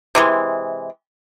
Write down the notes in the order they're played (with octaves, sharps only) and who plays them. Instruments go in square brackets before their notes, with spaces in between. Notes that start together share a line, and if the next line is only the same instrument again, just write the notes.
[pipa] C3 E3 G#3